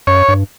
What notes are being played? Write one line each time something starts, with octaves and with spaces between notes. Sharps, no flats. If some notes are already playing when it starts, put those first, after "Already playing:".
F#2 C#5
G2